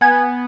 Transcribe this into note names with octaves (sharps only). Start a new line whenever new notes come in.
B3 G#5